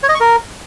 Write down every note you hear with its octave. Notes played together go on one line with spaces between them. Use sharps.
C#5
D#5
C#6
A#4